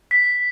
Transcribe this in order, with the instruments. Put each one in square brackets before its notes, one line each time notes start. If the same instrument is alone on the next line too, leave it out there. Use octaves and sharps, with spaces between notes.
[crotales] B6